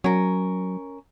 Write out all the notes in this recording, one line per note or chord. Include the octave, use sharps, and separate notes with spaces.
F#3 C#4 A#4